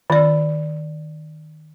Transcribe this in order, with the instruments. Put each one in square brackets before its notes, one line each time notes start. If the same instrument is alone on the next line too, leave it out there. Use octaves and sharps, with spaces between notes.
[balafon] D#3 D5